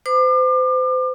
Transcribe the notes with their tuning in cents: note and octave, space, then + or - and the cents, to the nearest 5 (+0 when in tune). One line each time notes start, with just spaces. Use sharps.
C5 -35 D6 +35